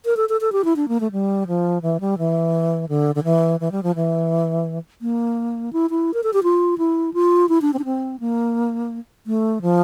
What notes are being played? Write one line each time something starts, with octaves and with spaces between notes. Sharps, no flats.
A#4
A4
A4
A4
G4
E4
D4
A#3
A3
G3
F3
E3
G3
E3
D3
D3
E3
E3
G3
F3
E3
A#3
E4
E4
A#4
A4
G4
F4
E4
F4
E4
D4
C4
D4
C4
A#3
A3
F3